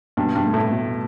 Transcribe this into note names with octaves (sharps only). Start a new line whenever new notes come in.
G2 B2
G2
A3
A2
B2